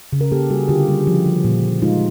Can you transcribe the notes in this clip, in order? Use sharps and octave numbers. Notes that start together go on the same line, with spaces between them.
C#3
A#4
A#3 G4 A4
G3 F#4 G#4
D3 F4 G4
G3
F3
F3
A#2
A#2
G#3 D#4 F4